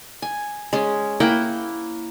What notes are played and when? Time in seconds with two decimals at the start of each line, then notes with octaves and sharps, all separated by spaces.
0.22 G#5
0.73 G#3 C#4
1.20 A#3 E4 F#5 G5